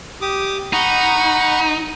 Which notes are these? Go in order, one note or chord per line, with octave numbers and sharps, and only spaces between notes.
G4 D6 D#6
D#4 F#5 B5 C#6